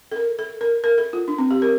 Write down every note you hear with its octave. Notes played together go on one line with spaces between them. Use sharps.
A4
A#4
A4
A#4
A#4
A4
F4
D4
C4
G4
A#4